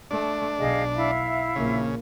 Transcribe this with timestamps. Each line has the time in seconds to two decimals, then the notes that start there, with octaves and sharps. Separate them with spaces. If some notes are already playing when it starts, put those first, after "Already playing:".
0.11 A3 D4
0.59 B1 G#4 D#5 F5
0.95 E4 E5 F5
1.56 A#1 C#3 A#3